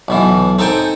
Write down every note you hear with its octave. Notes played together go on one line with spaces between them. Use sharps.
B1 B2 E3
C4 D#4 A4 G5 G#5